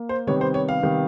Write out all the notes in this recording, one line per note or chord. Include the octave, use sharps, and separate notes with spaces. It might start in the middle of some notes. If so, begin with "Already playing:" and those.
Already playing: A#3
C5
C3 D#3 G3 B3 C#5
C5
C#5
F5
C3 D#3 G3 B3